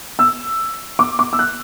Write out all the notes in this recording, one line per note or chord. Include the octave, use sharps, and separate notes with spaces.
E6
D6
D6
E6
F#6